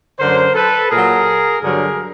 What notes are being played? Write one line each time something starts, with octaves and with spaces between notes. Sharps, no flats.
F#2 D3 F#3 A#4 C5
A4 B4
A#2 F#3 G#4 A#4
G2 D3 F#3 G#4 A#4